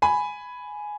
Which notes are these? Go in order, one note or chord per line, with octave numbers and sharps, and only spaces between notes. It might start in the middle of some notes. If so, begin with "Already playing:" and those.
G#5 B5